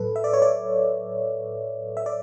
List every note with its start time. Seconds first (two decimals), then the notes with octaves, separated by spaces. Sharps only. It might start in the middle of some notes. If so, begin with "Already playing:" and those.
Already playing: A2 F#3 A4 B4
0.16 E5
0.24 D5
0.34 C#5
0.42 D5
1.97 E5
2.06 D5